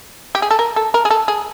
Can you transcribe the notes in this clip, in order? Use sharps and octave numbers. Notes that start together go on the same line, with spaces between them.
G4
G#4
A4
A#4
A4
A#4
G#4
A4
G#4